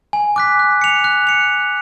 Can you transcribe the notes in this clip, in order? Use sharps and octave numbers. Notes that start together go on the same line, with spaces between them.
G#5
D6 F#6 B6
F#6
C#7 F7
F#6
C#7 F7